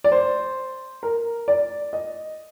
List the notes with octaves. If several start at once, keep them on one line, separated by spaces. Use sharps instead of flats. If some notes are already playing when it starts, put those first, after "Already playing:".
D5
C5
A#4
D5
D#5